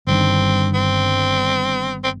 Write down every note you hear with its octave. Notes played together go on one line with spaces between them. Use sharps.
G1 G2 D#3 C4
C4
C4